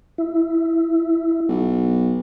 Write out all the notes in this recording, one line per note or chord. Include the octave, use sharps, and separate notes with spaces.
E4
B1